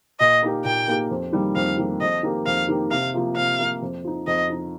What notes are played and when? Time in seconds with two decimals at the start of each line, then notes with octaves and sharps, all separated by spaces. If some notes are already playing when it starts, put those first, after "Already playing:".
0.20 A#2 D#5
0.42 A#3 D#4 G4 A#4
0.65 A#2 G5
0.88 A#3 D#4 G4 A#4
1.11 F2
1.33 D#3 G3 A#3
1.55 F2 F5
1.78 D#3 G3 A#3
2.01 F2 D#5
2.23 D#3 A#3 G4 A#4
2.46 F2 F5
2.68 D#3 A#3 G4 A#4
2.91 C3 F5
3.14 F3 A#3 F4
3.36 C3 F5
3.59 F3 A#3 F4
3.82 F2
4.04 F3 D#4
4.27 F2 D#5
4.49 F3 D#4